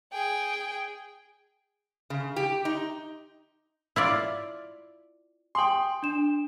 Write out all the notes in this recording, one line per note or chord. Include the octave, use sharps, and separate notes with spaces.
G#4 G5
C#3
G4
D#4
E4 F4 D5
G5 G#5 C6 D#6 F#7
D4 E7